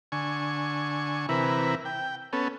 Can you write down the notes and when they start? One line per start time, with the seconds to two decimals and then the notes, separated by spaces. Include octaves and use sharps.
0.12 D3 G#5 C#6
1.29 C3 E3 E4 A#4 B4
1.85 G5
2.33 B3 C#4 A4